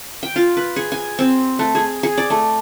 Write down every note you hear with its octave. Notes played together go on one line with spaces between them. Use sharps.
G5
F4
B4
G#4
G#5
C4
A3
G#4
G#4
D5
A3